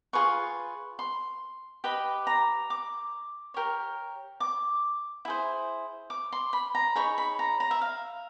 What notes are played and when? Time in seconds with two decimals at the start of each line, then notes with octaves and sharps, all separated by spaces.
0.13 F4 G#4 B4 C#6
0.99 C6
1.84 G4 B4 D#5 B5
2.27 A#5
2.70 D6
3.54 G4 A#4 C#5
4.40 D6
5.25 E4 G#4 C5
6.10 D6
6.32 C6
6.53 B5
6.75 A#5
6.95 D#4 G#4 C#5 B5
7.18 B5
7.39 A#5
7.60 A#5
7.71 E5
7.81 F5